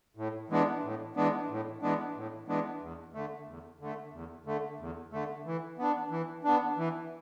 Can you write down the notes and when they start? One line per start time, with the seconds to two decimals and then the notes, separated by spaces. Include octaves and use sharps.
0.17 A2
0.50 E3 G#3 B3 D4
0.83 A2
1.16 E3 G#3 B3 D4
1.50 A2
1.82 E3 G#3 B3 D4
2.16 A2
2.48 E3 G#3 B3 D4
2.82 E2
3.14 D3 A3
3.47 E2
3.80 D3 A3
4.13 E2
4.46 D3 A3
4.79 E2
5.12 D3 A3
5.45 E3
5.78 B3 D4
6.11 E3
6.44 B3 D4
6.77 E3